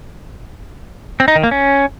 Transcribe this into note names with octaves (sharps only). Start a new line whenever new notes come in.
C4
D#4
D#3
A#3
C#4